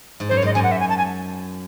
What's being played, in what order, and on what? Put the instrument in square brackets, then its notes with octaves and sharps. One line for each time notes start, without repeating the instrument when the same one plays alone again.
[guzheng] G#2
[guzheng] F#2 [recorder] C5
[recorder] C#5
[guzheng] G#2 [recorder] D#5
[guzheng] F#2 [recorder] G#5
[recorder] F#5
E5
G#5
A5
G#5